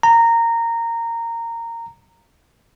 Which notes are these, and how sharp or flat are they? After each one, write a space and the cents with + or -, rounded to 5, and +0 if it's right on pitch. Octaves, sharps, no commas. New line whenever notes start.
A#5 -15